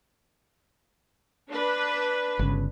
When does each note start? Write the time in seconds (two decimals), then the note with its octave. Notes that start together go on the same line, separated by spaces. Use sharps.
1.49 D4 B4
2.39 G1 C#3